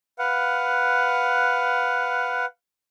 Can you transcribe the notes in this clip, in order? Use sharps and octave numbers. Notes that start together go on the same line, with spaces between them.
B4 F5 F#5